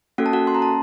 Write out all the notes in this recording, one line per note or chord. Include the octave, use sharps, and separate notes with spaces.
A#3 C#4 F#4 A4 F#5
A5
F#4 F#5
C6
A#5
A5